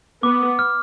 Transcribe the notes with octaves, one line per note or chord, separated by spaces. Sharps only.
B3 D6
F6